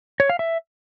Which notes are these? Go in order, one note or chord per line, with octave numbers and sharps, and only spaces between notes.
C#5
F5
E5